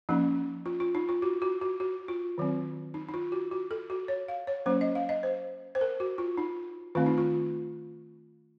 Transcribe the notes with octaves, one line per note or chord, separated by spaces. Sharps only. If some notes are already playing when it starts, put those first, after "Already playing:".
F3 A#3 C#4 D#4
F4
F4
D#4
F4
F#4
F#4
F#4
F#4
F4
D#3 F#3 C4
D#4
D#4
F4
F#4
F#4
A4
F#4
C#5
F5
C#5
F#3 A#3 C#4 C5
D#5
F5
D#5
C5
C5
A#4
F#4
F4
D#4
D#3 A3 C4 F4
D#4
F4